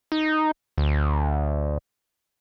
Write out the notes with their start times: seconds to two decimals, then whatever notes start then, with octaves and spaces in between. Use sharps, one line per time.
0.12 D#4
0.78 D2